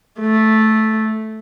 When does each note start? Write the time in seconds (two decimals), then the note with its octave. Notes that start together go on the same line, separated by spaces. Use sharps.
0.20 A3